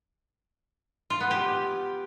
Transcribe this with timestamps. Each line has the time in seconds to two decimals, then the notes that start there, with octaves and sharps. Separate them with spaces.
1.10 F4
1.20 B3
1.31 G4